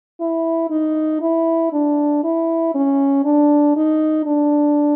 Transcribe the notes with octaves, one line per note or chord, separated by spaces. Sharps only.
E4
D#4
E4
D4
E4
C#4
D4
D#4
D4